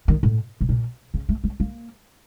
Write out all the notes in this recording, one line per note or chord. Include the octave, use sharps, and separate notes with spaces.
D#3
A2
A2
A#2
C#3
A3
A3
A#3